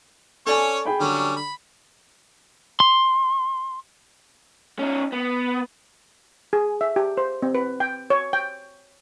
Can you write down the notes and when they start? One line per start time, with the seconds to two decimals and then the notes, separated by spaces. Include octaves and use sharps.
0.47 C#4 A4 C#5 D5 G#5
0.85 G#4 G5 B5
1.00 D3 F#3 G3 C#4
1.37 B5
2.80 C6
4.79 C#4 D#4
5.12 B3
6.53 G#4
6.81 E5
6.96 G4
7.17 C5
7.42 C4
7.55 B4
7.80 G5
8.10 C#5
8.33 G5